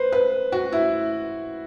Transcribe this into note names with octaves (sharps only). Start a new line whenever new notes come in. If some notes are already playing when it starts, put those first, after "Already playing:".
Already playing: B4 C5
B4
F#4
E4